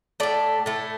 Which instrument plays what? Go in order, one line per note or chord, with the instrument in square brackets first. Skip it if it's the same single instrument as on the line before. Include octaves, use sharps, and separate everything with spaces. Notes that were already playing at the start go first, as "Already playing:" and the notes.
[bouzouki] A2 A3 D5
A2 A3